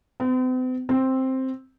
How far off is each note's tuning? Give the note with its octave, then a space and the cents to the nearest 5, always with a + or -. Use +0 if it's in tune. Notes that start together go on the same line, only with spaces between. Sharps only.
C4 -45
C4 +5